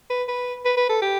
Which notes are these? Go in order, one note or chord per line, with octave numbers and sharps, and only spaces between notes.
B4
B4
B4
B4
A4
G4